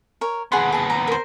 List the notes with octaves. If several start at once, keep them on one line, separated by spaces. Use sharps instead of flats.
A#4 C#5
D#2 B3 G#4 F#5 C6
G#4 A5
A#5
A#4 C5